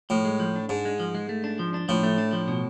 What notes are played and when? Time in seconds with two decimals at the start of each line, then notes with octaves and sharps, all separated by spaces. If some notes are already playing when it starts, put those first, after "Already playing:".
0.10 A2 F3
0.25 G#3
0.40 F3
0.56 D4
0.69 G#2 D4
0.85 G#3
1.00 F3
1.15 G#3
1.29 A3
1.44 D4
1.59 F3
1.74 D4
1.89 A2 F3
2.03 A3
2.18 D4
2.33 F3
2.48 B2